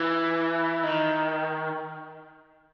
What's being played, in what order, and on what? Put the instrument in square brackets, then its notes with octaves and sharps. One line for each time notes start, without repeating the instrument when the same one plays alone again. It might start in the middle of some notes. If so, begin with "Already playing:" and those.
Already playing: [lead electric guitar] E3
D#3